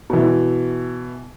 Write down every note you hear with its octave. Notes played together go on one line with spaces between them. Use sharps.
B2 E3